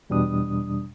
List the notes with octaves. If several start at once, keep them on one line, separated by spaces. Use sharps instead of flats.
E2 B2 G3 D4 D#6